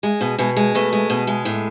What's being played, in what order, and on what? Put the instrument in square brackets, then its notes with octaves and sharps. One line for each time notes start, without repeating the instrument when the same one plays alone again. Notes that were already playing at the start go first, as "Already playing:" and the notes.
[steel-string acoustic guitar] G#3
B2
B2 G#3
G#3
B2 A3
G#3
B2
G#3
A2